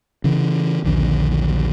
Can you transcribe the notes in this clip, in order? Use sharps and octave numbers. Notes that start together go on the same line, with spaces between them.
C#3 E3
A#1 D#2 D3 F3